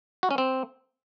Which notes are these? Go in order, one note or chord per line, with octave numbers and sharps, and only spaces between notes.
F#4
C#4
C4